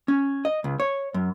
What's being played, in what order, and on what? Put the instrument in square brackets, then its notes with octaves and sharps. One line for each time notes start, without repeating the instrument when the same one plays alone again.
[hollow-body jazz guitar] C#4
D#5
C#2
C#5
F#2